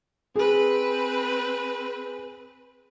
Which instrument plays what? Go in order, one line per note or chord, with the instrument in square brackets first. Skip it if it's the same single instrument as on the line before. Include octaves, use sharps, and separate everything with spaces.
[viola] C4 B4 [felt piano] G#4